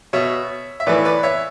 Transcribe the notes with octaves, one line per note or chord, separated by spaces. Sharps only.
B2 C#5 E5
E5
A2 E3 B4 D5
B4 D5
C#5 E5